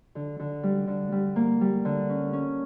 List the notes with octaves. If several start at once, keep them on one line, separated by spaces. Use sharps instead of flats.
D3
D3
G3
D3
G3
A#3
G3
D3
C#4
C#4